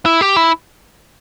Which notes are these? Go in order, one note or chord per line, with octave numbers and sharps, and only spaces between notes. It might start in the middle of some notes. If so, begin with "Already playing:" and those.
E4
G4
E4